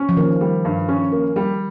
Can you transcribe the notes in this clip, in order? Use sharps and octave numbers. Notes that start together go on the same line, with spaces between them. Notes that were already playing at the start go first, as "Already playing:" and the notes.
Already playing: C#4
F3
D#3 A#3
G3
G2
C#4
A#3
G3